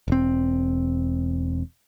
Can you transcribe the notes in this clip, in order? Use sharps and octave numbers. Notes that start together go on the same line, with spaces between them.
E1 C4